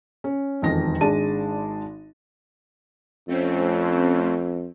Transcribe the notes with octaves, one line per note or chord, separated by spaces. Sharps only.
C#4
E1 F2 D#3 D#5 A#6
G#1 G#3 D4 A5 D#7
F2 A3 C4 C#4